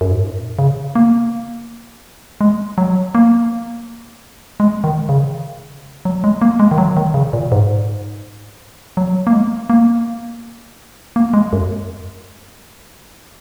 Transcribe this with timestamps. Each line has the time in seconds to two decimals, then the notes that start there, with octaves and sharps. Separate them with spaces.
0.01 F#2
0.11 G#2
0.23 A#2
0.59 C#3
0.95 A#3
2.41 G#3
2.78 F#3
3.15 A#3
4.60 G#3
4.84 D#3
5.09 C#3
6.05 F#3
6.24 G#3
6.42 A#3
6.60 G#3
6.71 D#3
6.78 F#3
6.97 D#3
7.14 C#3
7.33 A#2
7.52 G#2
8.97 F#3
9.27 A#3
9.33 G#3
9.70 A#3
11.16 A#3
11.34 G#3
11.53 F#2